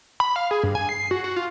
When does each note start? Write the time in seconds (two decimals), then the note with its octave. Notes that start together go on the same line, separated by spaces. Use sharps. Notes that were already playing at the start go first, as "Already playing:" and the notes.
0.20 B5
0.36 F5
0.51 G#4
0.63 G2
0.75 G#5
0.89 C7
1.11 F#4
1.24 F#4
1.36 F4